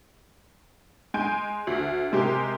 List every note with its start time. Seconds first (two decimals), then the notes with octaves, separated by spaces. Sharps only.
1.14 G#3 G#5 G6 D7
1.67 D2
2.12 C3 G#3 G4 A#4